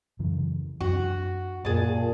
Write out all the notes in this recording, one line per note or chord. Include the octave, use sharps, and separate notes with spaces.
F#2 C#3 E3
F#2 D4 F#4
F#2 A#2 G#4 A5